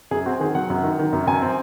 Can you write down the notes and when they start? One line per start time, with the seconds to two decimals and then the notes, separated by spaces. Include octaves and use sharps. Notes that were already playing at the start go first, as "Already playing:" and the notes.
0.11 F#2 G#4
0.26 C4 F#4
0.40 D#3 G#4
0.55 F#3 F#5
0.70 F#2
0.84 D#3
0.99 D#3
1.13 F#2
1.27 F#2 G#5
1.42 C4